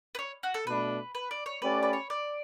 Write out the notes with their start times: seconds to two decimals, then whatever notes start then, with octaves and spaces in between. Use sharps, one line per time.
0.15 B4
0.19 C#5
0.43 F#4
0.54 A4
0.66 B2 A3 D4 B4
1.15 B4
1.31 D5
1.46 C#5
1.62 A3 C#4 G4 B4 D5
1.83 B4
1.93 C#5
2.10 D5